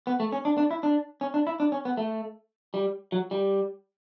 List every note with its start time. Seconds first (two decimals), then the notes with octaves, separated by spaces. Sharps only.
0.07 B3
0.20 A3
0.32 C#4
0.45 D4
0.58 D4
0.71 E4
0.83 D4
1.21 C#4
1.34 D4
1.47 E4
1.60 D4
1.72 C#4
1.85 B3
1.97 A3
2.74 G3
3.12 F#3
3.31 G3